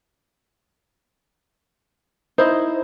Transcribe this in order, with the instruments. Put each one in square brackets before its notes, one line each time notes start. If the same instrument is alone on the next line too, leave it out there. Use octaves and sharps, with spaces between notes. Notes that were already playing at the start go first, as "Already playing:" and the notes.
[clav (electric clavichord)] D#4 E4 D#5 [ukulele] C5